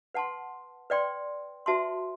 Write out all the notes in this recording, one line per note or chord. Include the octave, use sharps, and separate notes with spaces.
B4 F#5 A5 C6
B4 D5 G5 C6
F#4 B4 E5 A5 C6